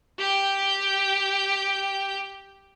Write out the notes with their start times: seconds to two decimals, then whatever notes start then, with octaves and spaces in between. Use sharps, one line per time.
0.19 G4 G5